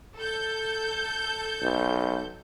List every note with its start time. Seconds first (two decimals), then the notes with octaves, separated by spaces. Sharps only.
0.17 A4 G6
1.63 B1